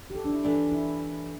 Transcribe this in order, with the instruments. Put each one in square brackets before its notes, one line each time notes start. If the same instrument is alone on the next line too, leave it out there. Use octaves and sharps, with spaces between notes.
[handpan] G4
A4
D4
E4
[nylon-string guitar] E3 A3 D4
[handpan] E4